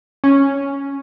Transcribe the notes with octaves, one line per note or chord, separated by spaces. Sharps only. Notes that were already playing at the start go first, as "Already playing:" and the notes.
C#4